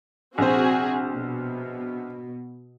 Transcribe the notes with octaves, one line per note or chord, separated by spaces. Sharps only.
A#1 C3 C4 F#4 G#4 C5
B2